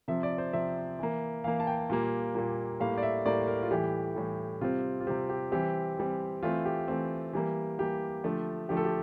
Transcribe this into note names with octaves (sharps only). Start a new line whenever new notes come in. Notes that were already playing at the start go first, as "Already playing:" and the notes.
C3 F3 C4 E5
D5
C5
C3 F3 C4 E5
E3 A#3
E3 A#3 F5
A5
G5
A#2 G3 A#3
A#2 G3 A#3
A2 G3 A#3 F5
D5
E5
A2 G3 A#3 D5
A#4
F4
A2 E3 G3 G4
A2 E3 G3
C3 G3 C4 F4
F4
C3 G3 C4 G4
G4
E3 G3 C4 G4
E3 G3 C4
E3 A3 C4 F4
G4
E3 A3 C4
E3 G3 A#3
E3 G3 A#3 G4
D3 F3 A3
D3 F3 A3 G4
A4
G4